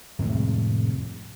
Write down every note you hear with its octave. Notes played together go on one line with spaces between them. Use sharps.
F2 A2 C3 G#3